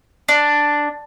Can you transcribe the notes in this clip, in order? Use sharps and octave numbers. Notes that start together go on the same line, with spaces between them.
D4